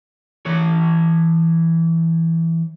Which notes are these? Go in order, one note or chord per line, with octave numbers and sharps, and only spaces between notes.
E3 C#5